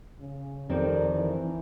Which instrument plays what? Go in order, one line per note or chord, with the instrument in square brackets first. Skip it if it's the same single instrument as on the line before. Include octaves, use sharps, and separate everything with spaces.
[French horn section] C#3
[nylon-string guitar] F2 D#3 C4 [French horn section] G4 A#4 D5
[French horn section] E3